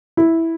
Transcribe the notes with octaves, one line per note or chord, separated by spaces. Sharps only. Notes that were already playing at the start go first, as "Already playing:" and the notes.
E4